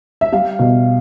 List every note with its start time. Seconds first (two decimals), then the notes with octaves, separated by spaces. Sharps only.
0.21 E5
0.32 G3 F5
0.59 B2